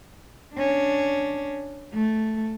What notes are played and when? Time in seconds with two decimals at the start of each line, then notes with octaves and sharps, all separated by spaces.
0.55 C#4 D4
1.93 A3